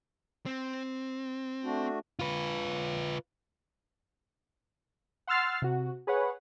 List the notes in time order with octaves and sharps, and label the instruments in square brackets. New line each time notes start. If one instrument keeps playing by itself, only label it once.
[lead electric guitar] C4
[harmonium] A3 D4 F#4
[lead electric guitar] F4 B4
[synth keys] F#5 C6 E6 F6 A6 C7
C3 F#4
G#4 B4 C#5 F#5